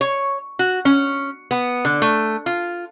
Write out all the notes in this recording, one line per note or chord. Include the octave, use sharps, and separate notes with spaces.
C#5
F#4
C#4
B3
D3
A3
F4